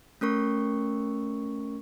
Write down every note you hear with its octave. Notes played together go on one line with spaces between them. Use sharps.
A3 C#4 A#4 C#6